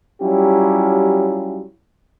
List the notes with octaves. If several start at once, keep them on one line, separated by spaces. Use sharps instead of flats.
F#3 G3 C#4 E4 F4 G4